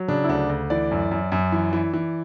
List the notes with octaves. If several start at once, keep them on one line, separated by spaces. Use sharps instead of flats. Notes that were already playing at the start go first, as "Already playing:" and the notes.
Already playing: F#3
C#3 D4
E4
D2 D4
D2
E3 D5
F#2
F#2
F#2
E3
E3
E3